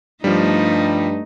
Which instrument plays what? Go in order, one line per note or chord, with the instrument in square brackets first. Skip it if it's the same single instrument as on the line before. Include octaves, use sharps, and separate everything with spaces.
[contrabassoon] G2 [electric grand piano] F3 G3 [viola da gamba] A3 D#4